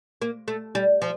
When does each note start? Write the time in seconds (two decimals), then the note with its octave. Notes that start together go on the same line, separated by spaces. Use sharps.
0.22 A#3
0.48 A3
0.75 G3
1.02 F3